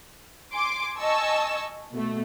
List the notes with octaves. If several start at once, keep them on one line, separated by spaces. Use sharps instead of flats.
G#5 C6 D6
D#5 G#5 A5 C#6 E6
B2 A3